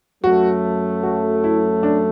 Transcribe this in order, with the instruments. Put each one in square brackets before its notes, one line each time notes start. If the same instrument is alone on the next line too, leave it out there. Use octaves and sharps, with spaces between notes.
[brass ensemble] F#2 F#3 A3 [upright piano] F#4
[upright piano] F#4
E4
D4